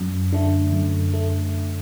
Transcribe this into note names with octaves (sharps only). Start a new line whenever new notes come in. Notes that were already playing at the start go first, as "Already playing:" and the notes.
Already playing: F#2
D3 A3
F#2
A3